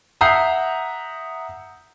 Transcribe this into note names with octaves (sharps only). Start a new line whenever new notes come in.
E5 F#5 A#5 D#6 G6 C7